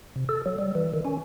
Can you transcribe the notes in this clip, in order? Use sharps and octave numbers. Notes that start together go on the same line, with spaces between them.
C3
A4
F#3
G3
E3
D#3
C#4